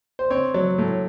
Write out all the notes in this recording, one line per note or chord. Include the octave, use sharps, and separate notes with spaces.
C5
C4 C#5
F#3
A2